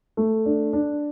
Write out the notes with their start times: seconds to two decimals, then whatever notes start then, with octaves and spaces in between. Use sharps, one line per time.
0.17 A3
0.46 D4
0.73 D4